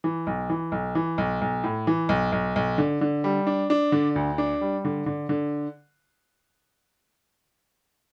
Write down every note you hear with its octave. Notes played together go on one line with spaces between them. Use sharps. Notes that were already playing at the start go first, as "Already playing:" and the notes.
E3
B1
E3
B1
E3
B1
B1
A2
E3
B1
B1
B1
D3
D3
G3
D4
D4
D3
D2
D4
G3
D3
D3
D3